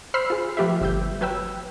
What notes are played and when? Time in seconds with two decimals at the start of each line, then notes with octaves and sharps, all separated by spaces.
0.14 C5 B5 E6 F6 C7
0.30 F4 G#4
0.57 F3 A3 G4 B4 E5
0.81 G1 E6 G6
1.21 F#3 B4 G5 E6